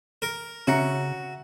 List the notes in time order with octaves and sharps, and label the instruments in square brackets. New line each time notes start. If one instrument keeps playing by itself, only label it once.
[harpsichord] A#4
[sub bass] C#3 [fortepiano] C#4 [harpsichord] F#4 [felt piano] E5 A#5 C#7